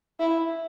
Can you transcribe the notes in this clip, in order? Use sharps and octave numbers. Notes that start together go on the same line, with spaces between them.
E4